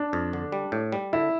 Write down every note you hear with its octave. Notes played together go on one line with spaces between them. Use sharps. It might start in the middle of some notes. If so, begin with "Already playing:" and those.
Already playing: D4
F2
D3
G3
A2
G3
D3 E4